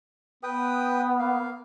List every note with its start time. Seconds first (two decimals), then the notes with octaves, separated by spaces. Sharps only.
0.43 B3 B4 G5 D#6
1.19 A#3 F5